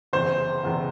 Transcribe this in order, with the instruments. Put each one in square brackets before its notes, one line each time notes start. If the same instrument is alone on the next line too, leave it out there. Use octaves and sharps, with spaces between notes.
[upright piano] F#1 E2 C3 [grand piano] C5
[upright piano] F#1 E2 C3